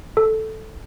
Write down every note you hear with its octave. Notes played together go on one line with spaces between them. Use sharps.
A4